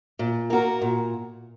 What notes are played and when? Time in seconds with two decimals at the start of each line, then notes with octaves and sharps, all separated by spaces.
0.19 A#2
0.50 A#3 F#4 A#4
0.81 A#2